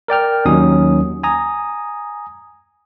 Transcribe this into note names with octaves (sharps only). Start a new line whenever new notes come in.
A#4 D5 G5 F6
D#2 F#3 C#4 D#4 D#6
G#5 A#5 D#6